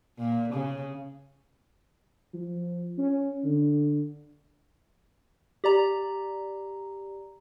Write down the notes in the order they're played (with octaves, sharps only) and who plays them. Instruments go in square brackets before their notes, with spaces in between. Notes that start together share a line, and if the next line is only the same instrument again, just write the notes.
[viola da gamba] A#2
C#3
[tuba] F3
C#4
D3
[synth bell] G4 D5 A#5